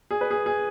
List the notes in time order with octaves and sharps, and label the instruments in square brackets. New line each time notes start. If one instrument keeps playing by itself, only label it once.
[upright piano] G#4
B4
G#4
G#4